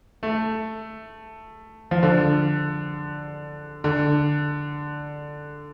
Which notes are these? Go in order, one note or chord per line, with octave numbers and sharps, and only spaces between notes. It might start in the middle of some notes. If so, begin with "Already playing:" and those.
A3
F3
D3
D3